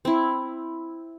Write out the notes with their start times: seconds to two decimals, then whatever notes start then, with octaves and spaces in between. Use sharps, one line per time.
0.05 C4 E4